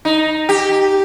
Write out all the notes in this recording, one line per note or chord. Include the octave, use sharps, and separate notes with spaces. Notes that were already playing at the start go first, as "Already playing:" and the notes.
D#4
G4